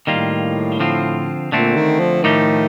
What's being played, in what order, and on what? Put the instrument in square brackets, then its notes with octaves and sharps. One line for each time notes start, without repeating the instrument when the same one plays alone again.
[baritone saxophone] A2 [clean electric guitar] D#3 G3 A#3 F4
[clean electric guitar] D3 F3 C4 F4
[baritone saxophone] A#2 [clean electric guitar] D3 A3 C4
[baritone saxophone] D#3
F3
[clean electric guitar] A2 F3 A3 D#4 G4 [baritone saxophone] D#3